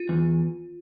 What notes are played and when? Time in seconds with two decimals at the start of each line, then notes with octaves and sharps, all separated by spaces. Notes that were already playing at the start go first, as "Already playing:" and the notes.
Already playing: F4
0.09 E2